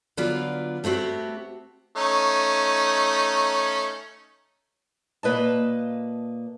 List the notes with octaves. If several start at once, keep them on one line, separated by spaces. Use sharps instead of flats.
D3 F#3 B3 F4 B4 D5
A3 B3 C4 F#4 G4
A3 C#4 D#4
A#2 A#3 B4 D#5 A5